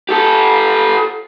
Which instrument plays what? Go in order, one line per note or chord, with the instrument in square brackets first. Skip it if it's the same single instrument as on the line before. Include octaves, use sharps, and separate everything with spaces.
[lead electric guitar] G4 A4